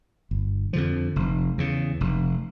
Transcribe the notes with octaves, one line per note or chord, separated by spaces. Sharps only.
G1
F2 D3 F3
F1
E2 C#3
F1